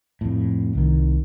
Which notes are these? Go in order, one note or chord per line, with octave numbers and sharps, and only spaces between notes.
F2 A2
C2 D#3